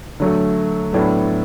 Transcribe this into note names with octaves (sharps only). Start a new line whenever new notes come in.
D3 F#3 A3
A2 F#3 B3 D4 A4